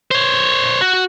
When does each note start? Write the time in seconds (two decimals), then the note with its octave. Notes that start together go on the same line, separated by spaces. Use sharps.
0.11 C5 C#5
0.81 F#4